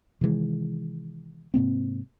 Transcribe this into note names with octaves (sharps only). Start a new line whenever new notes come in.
C3 D#3 E3 G#3
G#2 C3 A#3 C4